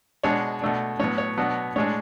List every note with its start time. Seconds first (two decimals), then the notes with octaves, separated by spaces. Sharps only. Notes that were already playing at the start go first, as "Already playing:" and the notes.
0.24 B2 G#3 D4 C#5
0.62 B2 A3 D4
0.99 A2 F#3 B3 C#5
1.18 C#5
1.37 B2 F#3 B3 D4
1.76 A2 G#3 D4 C#5